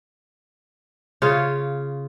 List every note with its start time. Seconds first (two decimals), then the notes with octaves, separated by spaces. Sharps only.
1.22 C#3 F4 C#5